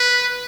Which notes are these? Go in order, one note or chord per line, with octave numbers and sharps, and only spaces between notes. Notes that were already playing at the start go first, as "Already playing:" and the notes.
Already playing: B4